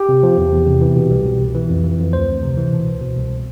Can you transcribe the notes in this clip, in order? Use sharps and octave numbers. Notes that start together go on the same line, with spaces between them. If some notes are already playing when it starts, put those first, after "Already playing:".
Already playing: G4
C3
F3
E2
E2
C3
E3
B2
C2
B2
C2
E3
F2
E3
F2
D2 C5
D2
C3
E3
B2
C2
B2
C2